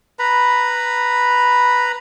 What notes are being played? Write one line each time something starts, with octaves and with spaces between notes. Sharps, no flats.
B4 A#5 B5